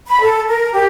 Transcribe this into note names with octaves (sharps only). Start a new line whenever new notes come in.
B5
A4
A#4
G4